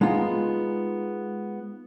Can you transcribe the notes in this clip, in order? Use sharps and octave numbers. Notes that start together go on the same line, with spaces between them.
G#3 B3 D#4 F4